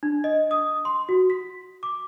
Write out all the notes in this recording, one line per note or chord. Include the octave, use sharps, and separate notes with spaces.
D4
D#5
D#6
C6
F#4
B6
D6